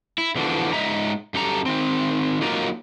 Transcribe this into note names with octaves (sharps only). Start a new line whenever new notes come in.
E4
E2 D3 E3 F3 D4 F#4
G#2 B3 D#5 E5 A#5
F#2 G3 A4 A#5
D#3 C4
F#3 A#3 D#4 F4 A#4